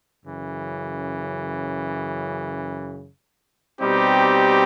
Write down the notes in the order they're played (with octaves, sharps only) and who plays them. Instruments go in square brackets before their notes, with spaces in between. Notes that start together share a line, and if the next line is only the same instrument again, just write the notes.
[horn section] F#2 C#3 E3
B2 G3 C4 D#4 G4